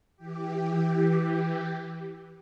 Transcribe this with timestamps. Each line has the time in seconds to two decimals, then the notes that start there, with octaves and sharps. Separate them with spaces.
0.17 E3 G4